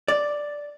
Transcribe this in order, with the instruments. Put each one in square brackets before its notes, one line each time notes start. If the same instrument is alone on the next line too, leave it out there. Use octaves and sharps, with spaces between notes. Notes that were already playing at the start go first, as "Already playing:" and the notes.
[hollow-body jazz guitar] D5